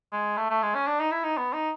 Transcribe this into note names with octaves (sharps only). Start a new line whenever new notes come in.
G#3
A3
A3
G#3
C#4
D4
D#4
E4
D#4
B3
D#4